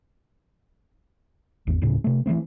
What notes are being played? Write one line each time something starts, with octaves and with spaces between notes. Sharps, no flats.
G#1 E2
D1 A2 C#3
C3 A3
E3 F3 A3 C4